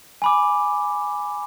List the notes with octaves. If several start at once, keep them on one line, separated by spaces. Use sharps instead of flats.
G#5 B5 D6